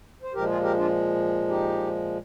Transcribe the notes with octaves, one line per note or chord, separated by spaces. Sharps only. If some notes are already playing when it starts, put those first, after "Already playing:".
C5
A#2 F3 G#3 G4 A#4
F4 G#4
G4 A#4
D4 F4
D#4 G4